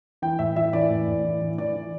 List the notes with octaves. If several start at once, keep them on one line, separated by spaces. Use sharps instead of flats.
E3 G5
A2 E5
E3 E5
E3 D5
A2
A2
E3
E3
E3 D5
E3